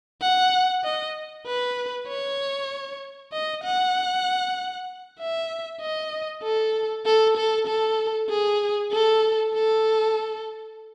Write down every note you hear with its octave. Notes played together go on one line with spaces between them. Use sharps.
F#5
D#5
B4
C#5
D#5
F#5
E5
D#5
A4
A4
A4
A4
G#4
A4
A4